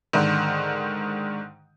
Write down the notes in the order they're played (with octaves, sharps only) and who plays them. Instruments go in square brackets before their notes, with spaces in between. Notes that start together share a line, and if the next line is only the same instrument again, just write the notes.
[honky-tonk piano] G#2 D3 D#3